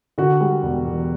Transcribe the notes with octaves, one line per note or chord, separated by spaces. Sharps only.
D3 F#4
G3
E1
E2